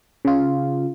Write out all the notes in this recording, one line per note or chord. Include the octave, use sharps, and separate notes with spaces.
C#3 F4